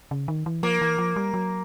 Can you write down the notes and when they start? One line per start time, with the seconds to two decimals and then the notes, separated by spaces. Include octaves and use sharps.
0.11 C#3
0.28 D#3
0.46 E3
0.63 F3 A#3
0.81 E3
0.98 F3
1.16 G3
1.34 F#3